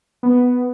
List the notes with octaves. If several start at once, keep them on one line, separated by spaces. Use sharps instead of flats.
B3